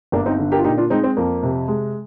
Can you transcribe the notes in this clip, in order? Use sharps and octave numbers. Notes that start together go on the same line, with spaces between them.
G1 A#3 D4
C4 D#4
D3
G4 A#4
F4
A#2 D#4 G4
D4 F4
G#3 C4 D#4
C4
F2 A#3
C3
G#3